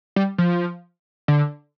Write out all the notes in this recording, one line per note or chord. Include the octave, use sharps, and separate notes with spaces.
G3
F3
D3